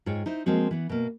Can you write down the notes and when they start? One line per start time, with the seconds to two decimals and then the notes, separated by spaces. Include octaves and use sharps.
0.06 G#2 F4 G#4 C#5 G5
0.26 D#4 E4 C5
0.46 F3 G#3 A#3 C4 F#4
0.71 E3 B3
0.89 B2 A#3